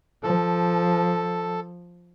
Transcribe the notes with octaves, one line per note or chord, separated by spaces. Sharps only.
F3 A4